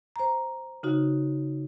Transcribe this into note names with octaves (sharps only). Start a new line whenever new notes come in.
C5 A#5
C#3 D#4 F#4